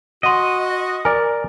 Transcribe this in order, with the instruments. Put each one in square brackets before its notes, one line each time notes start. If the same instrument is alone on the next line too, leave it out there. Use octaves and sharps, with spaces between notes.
[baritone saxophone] F#4 [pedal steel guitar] D#5 [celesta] F#5 C6
[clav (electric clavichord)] A#4 D5 [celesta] G#5